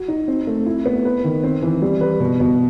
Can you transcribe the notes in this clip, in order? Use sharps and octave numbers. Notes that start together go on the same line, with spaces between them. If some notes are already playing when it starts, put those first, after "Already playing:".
Already playing: F#4
D#4
C4
A3
E4
B3
B4
D#3
C4
E3
G3
B4
B2
B2